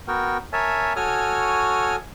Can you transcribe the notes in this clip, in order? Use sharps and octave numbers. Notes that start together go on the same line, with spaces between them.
B3 F#4 A#4 G5
A#4 C#5 E5 G#5 A5
F#4 A4 C#5 G#5 D#6 F6